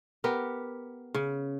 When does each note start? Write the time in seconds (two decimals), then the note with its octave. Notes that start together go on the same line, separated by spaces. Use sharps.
0.24 B3 G4 A#4
1.14 C#3